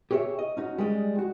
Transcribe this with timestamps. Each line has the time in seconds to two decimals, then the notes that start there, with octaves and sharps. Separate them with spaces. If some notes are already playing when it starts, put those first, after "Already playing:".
0.11 G4 G#4 C#5 D5 E5
0.39 D#5
0.57 C#4 D#4 F#4
0.78 G3 G#3 D#5
1.19 F#4